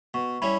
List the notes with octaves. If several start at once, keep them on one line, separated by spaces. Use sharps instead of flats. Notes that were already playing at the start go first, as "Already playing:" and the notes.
B2 C#6
G3 C#4 E4 B5